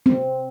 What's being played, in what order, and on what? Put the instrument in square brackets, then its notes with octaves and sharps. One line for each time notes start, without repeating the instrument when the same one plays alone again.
[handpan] C4